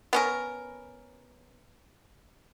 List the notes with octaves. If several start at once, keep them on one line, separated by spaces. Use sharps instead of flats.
B3 C#4 A#4